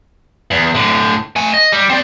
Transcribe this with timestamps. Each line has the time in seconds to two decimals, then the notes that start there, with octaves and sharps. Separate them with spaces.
0.51 E2
0.75 A2 D3
1.36 A3 G#5
1.54 D#5
1.72 G3
1.90 C4 D5